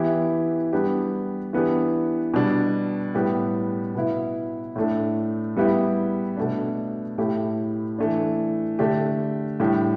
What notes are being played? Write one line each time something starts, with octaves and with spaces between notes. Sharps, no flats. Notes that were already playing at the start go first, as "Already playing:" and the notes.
Already playing: E3 B3 E4 G4
G3 B3 D4 G4
E3 B3 D4 G4
B2 G3 D4
A2 G3 B3 G4
B2 B3 E4
A2 A3 D4
G3 B3 E4 G4
B2 A3 D4
A2 A3 E4 G4
E3 A3 D4
D3 A3 D4 G4
A2 G3 D4 G4